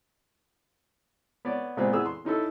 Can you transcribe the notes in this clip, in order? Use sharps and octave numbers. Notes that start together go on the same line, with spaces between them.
B3 C#5 D5
A#2 G#3 B3 C4
E3 B3 G#4 E6
C6
C#4 D#4 E4 A4